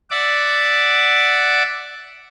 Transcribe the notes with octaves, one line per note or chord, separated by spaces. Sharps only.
D5 E5 F#5 D6